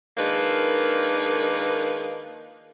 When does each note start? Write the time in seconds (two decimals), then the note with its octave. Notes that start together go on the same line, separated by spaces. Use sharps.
0.18 D#3 F3 G#3 A#3 D4 B4